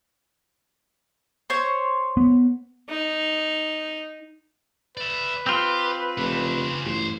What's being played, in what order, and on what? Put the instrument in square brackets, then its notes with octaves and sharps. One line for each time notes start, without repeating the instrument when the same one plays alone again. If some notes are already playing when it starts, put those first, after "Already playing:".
[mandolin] C5 C#5 C#6
[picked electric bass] B3
[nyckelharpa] D#4
[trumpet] B4 [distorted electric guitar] D5 E5
[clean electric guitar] C4 F4 [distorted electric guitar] G4
[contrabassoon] F1 [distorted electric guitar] C#3 D4
[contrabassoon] A1 [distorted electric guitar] G2 C5